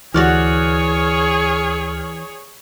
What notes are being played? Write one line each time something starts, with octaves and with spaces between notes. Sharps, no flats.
D2 E3 F#4 G#4 C#5 D5 F#5 F6